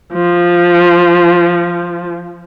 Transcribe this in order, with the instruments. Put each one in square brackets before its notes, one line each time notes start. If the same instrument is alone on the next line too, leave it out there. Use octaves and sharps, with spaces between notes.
[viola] F3